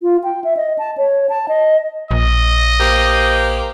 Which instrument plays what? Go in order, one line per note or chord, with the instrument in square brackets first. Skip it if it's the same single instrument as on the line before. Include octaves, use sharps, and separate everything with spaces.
[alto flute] F4
G5
E5
D#5
A5
C#5
A5
D#5
[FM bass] A#1 [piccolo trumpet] D#5
[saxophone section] A#3 G4 C5